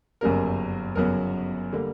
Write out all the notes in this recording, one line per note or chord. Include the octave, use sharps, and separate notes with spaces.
G1 F#2 C#3 G3 A#3 A#4
G1 F#2 C#3 F#3 B3 A#4
D3 G3 A#3